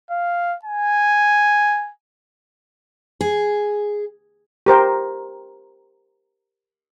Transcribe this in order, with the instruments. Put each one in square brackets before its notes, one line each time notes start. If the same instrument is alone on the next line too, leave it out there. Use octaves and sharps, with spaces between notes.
[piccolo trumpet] F5
G#5
[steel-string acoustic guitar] G#4
[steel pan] G4 A#4 C5 G5